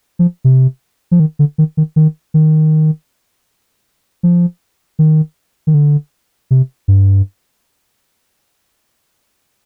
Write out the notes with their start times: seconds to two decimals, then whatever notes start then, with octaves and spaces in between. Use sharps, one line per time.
0.19 F3
0.44 C3
1.11 F3
1.20 D#3
1.39 D3
1.58 D#3
1.77 D#3
1.96 D#3
2.34 D#3
4.23 F3
4.99 D#3
5.67 D#3
5.74 D3
6.51 C3
6.88 G2